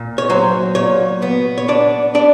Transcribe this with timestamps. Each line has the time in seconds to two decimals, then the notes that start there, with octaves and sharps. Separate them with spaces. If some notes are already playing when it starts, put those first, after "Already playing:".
Already playing: A#2
0.18 C#5
0.30 F#3 C5
0.75 A#2 C#5
1.22 B3
1.58 C#5
1.68 D4 D5
2.15 D4 D5